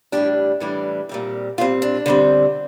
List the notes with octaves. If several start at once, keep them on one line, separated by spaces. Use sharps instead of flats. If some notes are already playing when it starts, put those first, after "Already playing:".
A2 E3 G3 D4 G4
A2 E3 G3 D4
A#2 G3 C4
A#2 G3 C4 F4
D4
D3 G3 C4